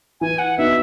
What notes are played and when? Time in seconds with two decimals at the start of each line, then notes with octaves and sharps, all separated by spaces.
0.21 E3 G#5
0.39 F#5
0.58 B3 D#4 F#4 E5